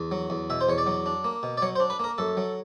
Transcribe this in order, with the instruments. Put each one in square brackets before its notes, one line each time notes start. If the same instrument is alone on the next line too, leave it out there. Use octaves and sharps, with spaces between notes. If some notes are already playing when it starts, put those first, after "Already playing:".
Already playing: [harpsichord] E2
F#3
E2
B2 E5
C5
E2 C#5
D5
F#3
D4
A#3
B2
D5
F#3 C#5
C5
D4
B4
A#3 A#4
F#2 A4
F#3